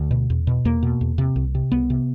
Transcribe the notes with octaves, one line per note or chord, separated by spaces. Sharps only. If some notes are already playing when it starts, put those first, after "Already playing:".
Already playing: D2 A3
B2
E2
B2
E2 A#3
B2
E2
C3
C2
C3
C2 B3
C3